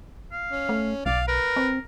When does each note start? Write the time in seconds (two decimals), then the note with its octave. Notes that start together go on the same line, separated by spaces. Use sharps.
0.32 F5
0.50 C#4
0.69 A3
1.06 B1 D5 F5
1.28 A#4 B4
1.56 C4